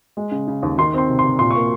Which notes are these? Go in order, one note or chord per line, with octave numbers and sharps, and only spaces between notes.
G#3
C#3
C#3
D#2
D#3 C6
C4 C6
C3
C6
C3
A#2 C6
A#3 C#6